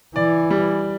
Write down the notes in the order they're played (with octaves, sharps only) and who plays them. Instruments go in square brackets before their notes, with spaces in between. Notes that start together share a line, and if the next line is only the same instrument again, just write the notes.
[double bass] E3 [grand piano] D5
[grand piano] G3